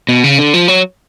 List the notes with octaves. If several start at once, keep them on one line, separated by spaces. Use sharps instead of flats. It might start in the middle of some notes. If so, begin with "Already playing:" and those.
B2
C#3
D3
F3
F#3